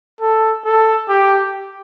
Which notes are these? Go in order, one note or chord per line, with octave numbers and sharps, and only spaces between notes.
A4
A4
G4